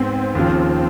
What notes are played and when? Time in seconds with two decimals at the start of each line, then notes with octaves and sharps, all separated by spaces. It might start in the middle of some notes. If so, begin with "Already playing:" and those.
Already playing: G#2 B3 C4
0.35 D#2 C#3 F3